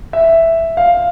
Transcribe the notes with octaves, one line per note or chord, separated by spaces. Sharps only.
E5
F5